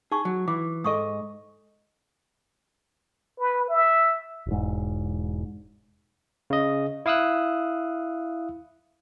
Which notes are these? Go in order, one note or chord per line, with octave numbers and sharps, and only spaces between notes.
D#4 G#4 C#6
F#3
E3 D6
G#2 A4 D#5 C#6 D#6
B4
E5
E1 G#2
C#3 D#5
E4 F5 D#6 E6 F#6